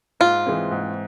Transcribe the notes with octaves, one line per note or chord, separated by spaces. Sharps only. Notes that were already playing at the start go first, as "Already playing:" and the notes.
G#2 F4
E3 G#3 C4
G#2